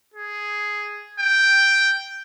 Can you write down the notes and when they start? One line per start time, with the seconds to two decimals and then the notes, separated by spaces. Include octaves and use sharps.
0.14 G#4
1.19 G5